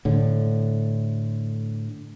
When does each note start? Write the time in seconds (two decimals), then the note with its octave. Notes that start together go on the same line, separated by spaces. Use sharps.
0.05 A2 D3